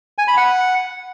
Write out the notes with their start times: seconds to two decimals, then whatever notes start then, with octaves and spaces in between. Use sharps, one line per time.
0.18 G#5
0.28 B5
0.37 F#5